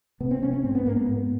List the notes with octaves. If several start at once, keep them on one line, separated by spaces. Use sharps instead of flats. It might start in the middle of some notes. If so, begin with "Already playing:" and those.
C3 B3
C4
C3 C#4
C#4
G#2 C4
B3
G#2 A#3
B3
G#2